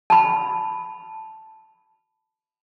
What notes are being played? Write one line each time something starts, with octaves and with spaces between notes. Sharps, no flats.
A5 B5